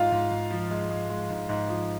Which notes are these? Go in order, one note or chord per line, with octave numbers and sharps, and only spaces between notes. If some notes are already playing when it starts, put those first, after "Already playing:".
Already playing: G#2 F4 F5
G#2
G#2
F3
G#3
G#3
G#3
G#2
G#2
F3